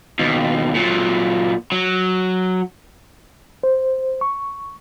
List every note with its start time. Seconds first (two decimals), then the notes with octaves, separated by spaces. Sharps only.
0.19 D#2 B2
0.75 A#2 F#3
1.72 F#3
3.63 C5
4.21 C#6